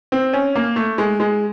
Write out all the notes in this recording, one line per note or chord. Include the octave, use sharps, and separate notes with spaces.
C4
C#4
A#3
A3
G#3
G#3